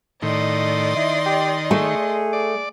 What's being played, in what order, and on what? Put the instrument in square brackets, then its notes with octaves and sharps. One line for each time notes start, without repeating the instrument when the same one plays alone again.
[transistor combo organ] A2 D#3 [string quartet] D5 D#5 C6
[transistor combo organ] D#3 [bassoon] E4
[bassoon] G4
[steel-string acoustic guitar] A3 [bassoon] G#4
[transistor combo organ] D5